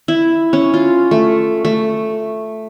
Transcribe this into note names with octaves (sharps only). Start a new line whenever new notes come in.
E4
C#4
F4
A3
A3